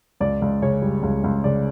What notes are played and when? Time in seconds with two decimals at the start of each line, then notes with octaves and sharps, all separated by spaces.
0.20 C#2 D5
0.41 C#2 D5
0.62 C#3 C#5
0.82 G3
1.03 C#2
1.24 C#2
1.44 C#3 D5